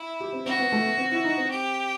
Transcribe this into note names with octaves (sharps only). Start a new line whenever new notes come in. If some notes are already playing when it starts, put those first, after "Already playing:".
Already playing: E4
G4
C4
C4 F#4
B3
A3
B3
C4
E4
D#4
C4
G4